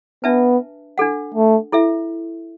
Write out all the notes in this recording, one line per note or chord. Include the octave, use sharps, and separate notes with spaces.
B3 D4 B4 E5 A5
D4 A4 F#5
A3
E4 A4 E5